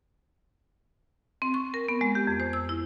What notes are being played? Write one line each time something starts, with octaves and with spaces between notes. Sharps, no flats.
C4
C#6
A#4
B3
G#3
G4
F2
C5
E6
E4